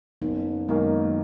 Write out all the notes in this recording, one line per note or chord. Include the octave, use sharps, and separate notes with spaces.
F#1 B3 D#4
F#2 D#3 G#3 A#3 B3 D#4